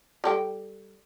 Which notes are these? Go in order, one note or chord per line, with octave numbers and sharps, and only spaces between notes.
G3 A4 G5